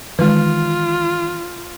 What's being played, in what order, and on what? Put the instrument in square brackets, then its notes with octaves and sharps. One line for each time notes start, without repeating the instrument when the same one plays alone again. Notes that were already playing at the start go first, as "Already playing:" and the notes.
[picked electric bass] D#3 E3 [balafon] G#3 B4 [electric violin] F4